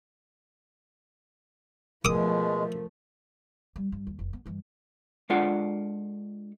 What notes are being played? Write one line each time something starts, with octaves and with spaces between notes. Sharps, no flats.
B2 F3 G#3 A3 A#4 D6 D#6
G3
G2
D#2
F1
B3
G2 E3
G#3 D4 F4 A4 D5 F#5